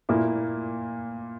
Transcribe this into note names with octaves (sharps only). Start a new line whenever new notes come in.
A#2 A#3 E4